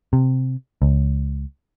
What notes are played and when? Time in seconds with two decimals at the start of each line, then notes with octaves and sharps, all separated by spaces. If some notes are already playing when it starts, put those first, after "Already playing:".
0.13 C3
0.82 C#2